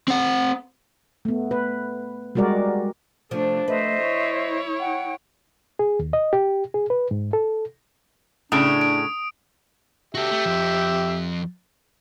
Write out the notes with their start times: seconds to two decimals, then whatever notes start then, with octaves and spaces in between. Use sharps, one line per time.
0.08 C4 F#5
1.25 A3 B3
1.51 B4
2.35 G3 G#3 F#4 A#4 D5
3.31 C3 F3 A3 D4
3.68 A3 B4 C5 D#5 E5
4.01 E4 C#5
4.80 F#5 G5
5.79 G#4
5.99 D#2
6.13 D#5
6.33 G4
6.74 G#4
6.90 B4
7.11 G#2
7.33 A4
8.52 A2 C#3 D4 D#6 D7
8.81 D7
10.15 F#4 G4 A4 E5
10.31 A3
10.45 F2 F3